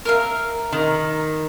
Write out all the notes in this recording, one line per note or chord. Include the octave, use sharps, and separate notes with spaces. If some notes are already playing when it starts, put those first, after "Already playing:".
A#4 E5 F5
D#3